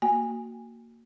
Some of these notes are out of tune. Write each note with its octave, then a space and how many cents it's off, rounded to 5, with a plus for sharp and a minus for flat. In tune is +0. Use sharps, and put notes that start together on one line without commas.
A#3 -15 F#4 +0 G#5 -15